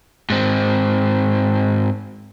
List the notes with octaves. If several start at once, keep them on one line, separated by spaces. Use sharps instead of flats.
G#2 C4